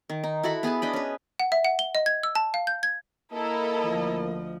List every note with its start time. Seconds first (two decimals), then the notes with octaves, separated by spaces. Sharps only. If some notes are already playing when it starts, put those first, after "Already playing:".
0.10 D#3
0.24 D#4
0.43 E4 F#4 A4 B5
0.63 B3 G#4 B4 A5
0.82 D4 D#5 B5
0.93 C#4 B4
1.40 F#5
1.52 E5
1.65 F#5
1.79 G7
1.95 D#5
2.06 G#6
2.23 E6
2.35 A5
2.54 F5
2.67 G6
2.83 G#6
3.33 A#3 E4 A4 A#4 D#5
3.82 D2 F3